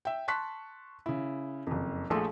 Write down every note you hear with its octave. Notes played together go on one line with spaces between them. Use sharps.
E5 G5
A5 C6 C#6 F#6 B6
C#3 E4
F#1 F2
A#1 F3 A3 G#4 A4 C6